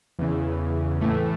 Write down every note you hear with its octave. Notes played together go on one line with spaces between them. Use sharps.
E2 C#3 E3
A2 E3 A3